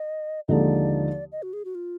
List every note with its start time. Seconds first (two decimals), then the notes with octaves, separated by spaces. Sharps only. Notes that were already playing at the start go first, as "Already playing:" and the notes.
Already playing: D#5
0.48 D#2 D3 F3 G#3 D#4 D5 D#5
1.32 D#5
1.42 F#4
1.53 G#4
1.65 F#4
1.75 F4